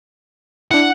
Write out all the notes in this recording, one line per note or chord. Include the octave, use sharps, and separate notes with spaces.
D4 E4 F#5